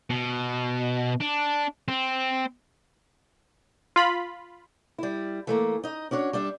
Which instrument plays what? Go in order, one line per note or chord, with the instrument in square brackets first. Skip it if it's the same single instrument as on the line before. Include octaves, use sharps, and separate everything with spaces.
[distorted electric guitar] B2
D4
C4
[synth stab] F4 B5
[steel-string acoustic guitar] G3 E4
E3 A3 A#3
D#4 D#5
C#4 D4 F#4 C#5
G3 D4 E5